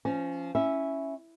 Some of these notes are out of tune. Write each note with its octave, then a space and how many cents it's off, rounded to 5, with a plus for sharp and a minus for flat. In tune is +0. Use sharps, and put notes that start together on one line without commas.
F3 -20 C#4 +0
C#4 +0 E4 +0 E5 +0